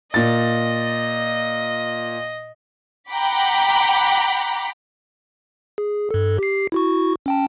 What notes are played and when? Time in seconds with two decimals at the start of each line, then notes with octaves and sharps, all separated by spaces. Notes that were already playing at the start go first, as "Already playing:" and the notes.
0.14 A#2 D#5 A6
3.10 F#5 G5 A#5 B5 D6
5.78 G#4
6.11 G2 A4
6.38 G4 C7
6.72 E4 F#4 C#6
7.26 C#4 G5 A5